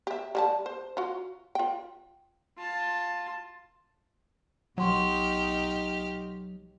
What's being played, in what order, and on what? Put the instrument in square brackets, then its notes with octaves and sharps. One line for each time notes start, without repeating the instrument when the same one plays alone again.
[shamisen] G4 E5
G3 G4 A5
C5
F4 F#4
F4 G5
[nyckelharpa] F4 A5
[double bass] B1 D#4 [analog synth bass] F#3 [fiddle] G4 F6 [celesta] F#5 C6 C#6